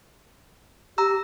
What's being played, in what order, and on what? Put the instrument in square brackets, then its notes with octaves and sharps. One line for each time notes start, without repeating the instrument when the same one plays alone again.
[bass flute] G4 [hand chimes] A#5 E6